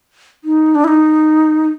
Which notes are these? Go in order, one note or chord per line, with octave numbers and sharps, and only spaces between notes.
D#4
D4
E4
D#4